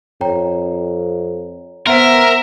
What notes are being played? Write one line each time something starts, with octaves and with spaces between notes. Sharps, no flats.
F2 C#5 G5 A#5
B3 A#4 C5 E5 F#5 C6